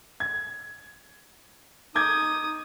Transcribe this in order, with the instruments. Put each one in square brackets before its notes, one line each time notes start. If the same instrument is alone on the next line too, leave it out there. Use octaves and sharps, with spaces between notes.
[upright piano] G#6
[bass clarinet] D#4 [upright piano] D6 G6 G#6 [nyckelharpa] D#6